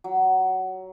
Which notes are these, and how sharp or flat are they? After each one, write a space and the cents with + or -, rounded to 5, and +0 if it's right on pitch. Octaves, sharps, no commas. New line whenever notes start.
F#3 +15